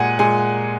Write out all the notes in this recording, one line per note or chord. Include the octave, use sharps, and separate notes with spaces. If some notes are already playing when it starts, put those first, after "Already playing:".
Already playing: A#2 G#3 F#5 G#5
A#2 G#3 G#5